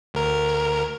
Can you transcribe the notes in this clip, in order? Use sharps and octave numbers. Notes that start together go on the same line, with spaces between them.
D2 A#4